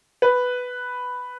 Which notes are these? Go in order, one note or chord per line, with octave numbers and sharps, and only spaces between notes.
B4